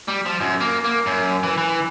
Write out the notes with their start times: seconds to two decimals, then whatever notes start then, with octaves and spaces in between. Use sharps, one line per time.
0.08 G3
0.26 F3
0.41 F#2
0.60 A#3
0.85 A#3
1.07 F#2
1.43 E3
1.58 E3